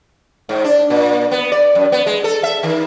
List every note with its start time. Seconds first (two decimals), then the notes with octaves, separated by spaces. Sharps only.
0.49 G#2
0.64 D4
0.90 A#2
1.31 B3
1.52 D5
1.75 F#2
1.92 B3
2.06 G#3
2.24 A4
2.43 E5
2.63 D#3